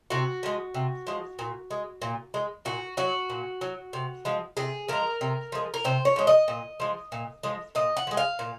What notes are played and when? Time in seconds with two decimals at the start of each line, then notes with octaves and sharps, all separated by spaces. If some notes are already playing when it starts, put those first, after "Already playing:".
0.10 C3 F#4
0.43 F3 G#3
0.74 C3
1.07 F3 G#3
1.39 A#2
1.71 G#3
2.02 A#2
2.34 G#3
2.65 A#2 F#4
2.97 F#3 F#4
3.30 A#2
3.61 F#3
3.93 C3
4.25 F3 G#3
4.57 C3 G#4
4.88 F3 G#3 A#4
5.21 C3
5.52 F3 G#3
5.74 A#4
5.84 C3 C5
6.05 C#5
6.16 F3 G#3
6.27 D#5
6.48 A#2
6.80 F3 G#3
7.12 A#2
7.43 F3 G#3
7.75 A#2 D#5
7.97 F#5
8.07 F3
8.11 G#3
8.17 F5
8.39 A#2